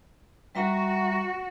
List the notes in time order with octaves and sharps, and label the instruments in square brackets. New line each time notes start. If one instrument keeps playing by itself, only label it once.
[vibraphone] G3 E5 A#5 [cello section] F#4